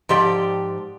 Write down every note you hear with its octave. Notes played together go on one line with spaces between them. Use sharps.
G#2 F3 G4 D5 G5